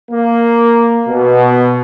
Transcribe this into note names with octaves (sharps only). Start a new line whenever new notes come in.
A#3
B2